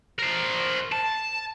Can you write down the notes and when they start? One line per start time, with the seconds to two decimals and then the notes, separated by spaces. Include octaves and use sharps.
0.19 A#4 C5
0.92 A5